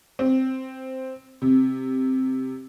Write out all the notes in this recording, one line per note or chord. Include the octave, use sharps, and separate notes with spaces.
C4
C3